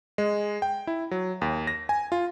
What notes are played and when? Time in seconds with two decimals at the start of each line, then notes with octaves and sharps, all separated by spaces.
0.18 G#3
0.62 G5
0.87 E4
1.11 F#3
1.42 D#2
1.67 A#6
1.89 G#5
2.12 F4